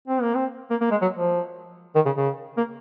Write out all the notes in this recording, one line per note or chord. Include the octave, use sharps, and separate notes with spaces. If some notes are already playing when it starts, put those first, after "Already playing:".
C4
A#3
C4
A#3
A#3
G#3
F#3
F3
D#3
C#3
C#3
A#3